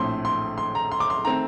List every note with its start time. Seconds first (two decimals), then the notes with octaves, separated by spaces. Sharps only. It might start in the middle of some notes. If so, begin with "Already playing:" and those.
Already playing: A#1 A2 A3 C4 C6
0.25 C6
0.58 C6
0.75 A#5
0.92 C6
1.00 D6
1.10 C6
1.25 D#3 A3 C4 A#5